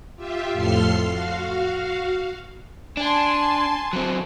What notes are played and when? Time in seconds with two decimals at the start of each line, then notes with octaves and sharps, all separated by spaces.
0.16 F4 G4 E5
0.52 F2 A2 A4 C6 F6 C7
1.07 F#4 F5
2.97 D4 G#5 A5 C6
3.93 F#3 C4